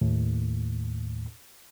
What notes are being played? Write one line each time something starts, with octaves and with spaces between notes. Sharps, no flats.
D#2 A2